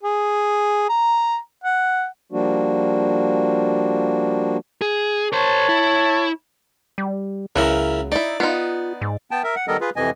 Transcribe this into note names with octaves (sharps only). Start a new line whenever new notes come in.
G#4
A#5
F#5
F3 G3 A#3 D4 F#4
G#4
A#4 C5 C#5 A5
E4
G3
C#2 C#3 F#3 E4 A#4 B4
D#4 E4 D5
B3 D#4 F4
G#2
B3 G5 A5
A#4 E5
F#5
D#3 G3 B3 A4 A#4 D#5
F4 G#4 B4
F2 C3 E3 D#5 G#5